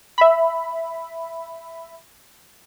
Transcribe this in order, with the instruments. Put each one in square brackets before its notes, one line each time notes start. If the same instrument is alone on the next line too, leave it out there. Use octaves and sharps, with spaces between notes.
[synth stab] E5 B5